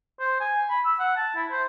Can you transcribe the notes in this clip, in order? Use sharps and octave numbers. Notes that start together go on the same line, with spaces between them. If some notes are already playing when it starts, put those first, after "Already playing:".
C5
G#5
B5
E6
F#5
A5
E4
C5